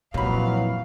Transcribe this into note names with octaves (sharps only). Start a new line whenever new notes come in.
F2 A#2 E3 F#3 F5 B5